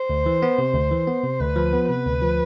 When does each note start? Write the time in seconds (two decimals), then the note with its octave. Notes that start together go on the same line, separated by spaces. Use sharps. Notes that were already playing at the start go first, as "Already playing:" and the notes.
Already playing: C5
0.10 D2
0.26 E3
0.42 B3
0.58 C3
0.74 D2
0.91 E3
1.08 B3
1.23 C3
1.40 D2 B4
1.56 F3
1.73 B3
1.89 C3 B4
2.06 D2
2.22 F3